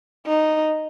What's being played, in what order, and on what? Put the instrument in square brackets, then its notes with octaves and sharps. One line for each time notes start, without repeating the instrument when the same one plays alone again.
[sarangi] D#4